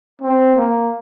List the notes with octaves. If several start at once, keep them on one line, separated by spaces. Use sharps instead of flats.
C4
A#3